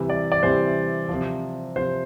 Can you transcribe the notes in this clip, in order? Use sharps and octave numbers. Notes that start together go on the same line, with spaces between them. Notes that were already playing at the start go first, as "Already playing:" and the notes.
Already playing: C3 E3 G3
D5
D5
C3 E3 G3 C5
C3 F3
C3 F3 C5